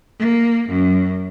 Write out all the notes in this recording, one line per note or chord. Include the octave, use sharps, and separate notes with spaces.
A#3
F#2